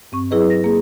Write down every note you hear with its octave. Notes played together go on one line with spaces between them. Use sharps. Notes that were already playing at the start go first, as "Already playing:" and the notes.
G2 C4 C#6
F#3 E4 G#4 B4 D#5
A#6
A#3 G#4